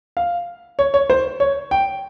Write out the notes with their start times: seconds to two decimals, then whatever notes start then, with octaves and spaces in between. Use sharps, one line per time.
0.17 F5
0.79 C#5
0.94 C#5
1.10 C5
1.40 C#5
1.71 G5